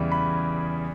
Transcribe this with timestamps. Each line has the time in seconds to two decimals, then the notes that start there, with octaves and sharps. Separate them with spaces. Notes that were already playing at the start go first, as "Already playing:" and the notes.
Already playing: E2 C#3 E3 G3
0.12 B5